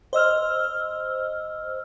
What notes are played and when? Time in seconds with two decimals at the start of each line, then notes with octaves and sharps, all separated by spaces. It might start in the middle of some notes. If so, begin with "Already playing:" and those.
0.13 C5 D#5 E6 F6